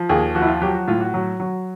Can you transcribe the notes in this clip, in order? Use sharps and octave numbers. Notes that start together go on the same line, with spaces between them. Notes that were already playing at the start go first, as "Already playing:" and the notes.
Already playing: F3
D#2 G#4
F3 F#4
E4
F4
F#3 G4
F#4
A2 F4
F#4
F#3
F#3